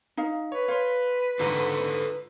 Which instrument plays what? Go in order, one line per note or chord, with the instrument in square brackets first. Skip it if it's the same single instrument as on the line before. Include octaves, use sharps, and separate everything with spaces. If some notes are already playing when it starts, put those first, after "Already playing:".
[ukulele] D#4 F5
[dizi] B4 [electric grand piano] C#5
[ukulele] C#5 [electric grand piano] F5 C6
[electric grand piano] G#2 D3 [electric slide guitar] F4 A4 A#5